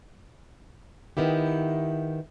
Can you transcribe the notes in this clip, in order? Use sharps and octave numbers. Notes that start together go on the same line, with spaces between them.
D#3 B3 E4 G4